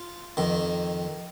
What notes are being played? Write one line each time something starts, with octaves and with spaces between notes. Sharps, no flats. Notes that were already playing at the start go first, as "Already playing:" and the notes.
Already playing: F4
F2 D#3